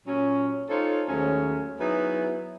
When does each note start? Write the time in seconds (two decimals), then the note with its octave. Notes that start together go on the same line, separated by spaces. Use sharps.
0.06 A#2 F#3 C#4
0.68 D#4 F4 A4 C5 C#5
1.08 D#2 F#3 G#3 A3 C#4
1.79 F#3 B3 D#4 E4 G#4